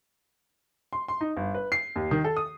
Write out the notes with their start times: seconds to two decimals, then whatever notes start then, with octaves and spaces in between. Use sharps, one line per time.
0.93 C6
1.08 C6
1.21 D#4
1.37 G1
1.55 B4
1.72 C7
1.96 D#2
2.11 D#3
2.24 A4
2.37 D#6